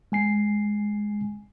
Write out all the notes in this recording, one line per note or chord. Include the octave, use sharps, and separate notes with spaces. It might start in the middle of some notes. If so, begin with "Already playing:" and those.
G#3 G#5 C7